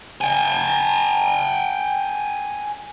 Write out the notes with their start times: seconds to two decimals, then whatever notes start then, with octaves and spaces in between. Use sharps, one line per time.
0.21 G5 G#5